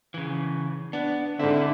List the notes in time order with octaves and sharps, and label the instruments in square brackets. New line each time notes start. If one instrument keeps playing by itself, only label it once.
[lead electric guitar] C#3 E3
[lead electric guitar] B3 [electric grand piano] D4
[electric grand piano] G#2 C4 [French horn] D3 [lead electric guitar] E4